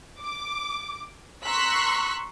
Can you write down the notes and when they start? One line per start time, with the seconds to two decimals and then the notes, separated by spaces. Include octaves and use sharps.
0.19 D6
1.44 A#5 C6 C#6 E6 F#6 B6